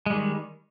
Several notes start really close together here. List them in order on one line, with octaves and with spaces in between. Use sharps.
G#3 G3 D#3